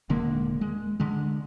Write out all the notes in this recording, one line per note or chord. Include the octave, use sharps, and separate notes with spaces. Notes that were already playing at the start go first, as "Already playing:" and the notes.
D#1 D3 G#3 A#3
G#3
D3 G#3